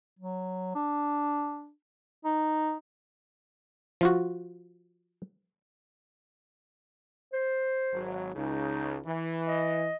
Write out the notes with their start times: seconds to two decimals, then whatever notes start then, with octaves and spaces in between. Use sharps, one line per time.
0.19 F#3
0.75 D4
2.25 D#4
4.01 F3 F4 F#4
7.33 C5
7.91 G#1 F#3
8.34 C#2 C#3 D#4
9.05 E3
9.47 D#5